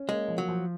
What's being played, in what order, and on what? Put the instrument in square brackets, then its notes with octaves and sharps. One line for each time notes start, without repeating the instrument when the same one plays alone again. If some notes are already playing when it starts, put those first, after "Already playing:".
Already playing: [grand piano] C#4
[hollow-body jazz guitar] G#3 [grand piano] A#3
[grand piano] F3
[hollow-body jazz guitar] F#3
[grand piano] F3